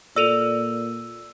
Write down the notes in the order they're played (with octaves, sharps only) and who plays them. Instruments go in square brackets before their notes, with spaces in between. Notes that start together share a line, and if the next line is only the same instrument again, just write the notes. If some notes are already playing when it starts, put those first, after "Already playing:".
[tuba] A#2 [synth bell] A4 D5 [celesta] E6 D#7 F7